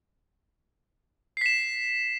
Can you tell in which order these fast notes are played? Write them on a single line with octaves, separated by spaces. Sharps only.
C7 B6 E7